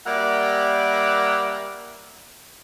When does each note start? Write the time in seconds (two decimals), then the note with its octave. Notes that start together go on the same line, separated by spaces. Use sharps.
0.06 G3 A#3 A#4 D5 E5 F#5